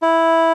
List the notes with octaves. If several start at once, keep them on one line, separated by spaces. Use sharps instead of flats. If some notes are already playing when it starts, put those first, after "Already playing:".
E4